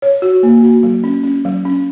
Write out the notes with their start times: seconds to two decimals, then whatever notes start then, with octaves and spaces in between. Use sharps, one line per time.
0.02 C#5
0.22 F#4
0.43 A#3
0.63 F#4
0.83 F#3
1.04 C#4
1.24 C#4
1.45 F#3
1.65 C#4